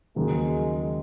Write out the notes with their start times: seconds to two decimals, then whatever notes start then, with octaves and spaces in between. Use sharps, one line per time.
0.16 D#2 C#3 F#3 G#3 A#3 D#4